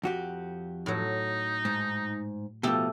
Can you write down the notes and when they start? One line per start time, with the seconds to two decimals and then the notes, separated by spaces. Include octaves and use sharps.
0.03 F2 F#4 G4
0.86 A2 F#3 D#4
1.65 G#2 A5
2.63 B2 F3 A3 G4 A4